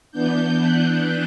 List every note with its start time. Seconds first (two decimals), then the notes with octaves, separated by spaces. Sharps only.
0.11 E3 B3 D4 G6
0.61 F#6